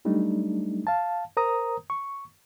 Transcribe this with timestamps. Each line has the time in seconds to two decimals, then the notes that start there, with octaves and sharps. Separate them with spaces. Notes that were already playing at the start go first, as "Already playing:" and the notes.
0.05 F#3 G3 A3 D4 D#4
0.87 F5 A5
1.37 A#4 C5 A#5 D#6
1.90 C#6